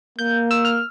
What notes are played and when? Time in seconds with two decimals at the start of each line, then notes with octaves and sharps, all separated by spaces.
0.18 A#3 G6
0.51 E6
0.65 F6